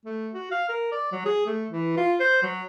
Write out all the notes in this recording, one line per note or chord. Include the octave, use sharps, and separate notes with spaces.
A3
F#4
F5
A#4
D5
F#3
G#4
A3
E3
F4
C5
F#3